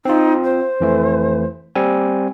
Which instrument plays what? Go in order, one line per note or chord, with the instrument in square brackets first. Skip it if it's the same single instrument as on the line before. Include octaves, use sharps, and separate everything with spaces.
[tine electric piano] C4 F4 [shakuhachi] D#4
[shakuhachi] C5
[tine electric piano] F2 E3 A3
[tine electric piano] G3 C4 G#5 [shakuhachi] A#3